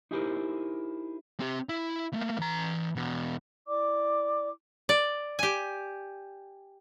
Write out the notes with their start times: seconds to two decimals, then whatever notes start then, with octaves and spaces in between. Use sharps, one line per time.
0.11 D#4 E4 G4 G#4 A#4 C5
1.40 C4 G4
1.69 E4
2.13 A3 A#3
2.39 E3 A#5
2.96 E2 B2
3.67 E4 D5 D6
4.89 D5
5.39 G4 G#5